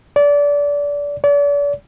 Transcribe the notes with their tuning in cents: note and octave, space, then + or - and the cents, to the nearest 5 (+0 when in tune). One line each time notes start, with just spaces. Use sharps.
D5 -25
D5 -40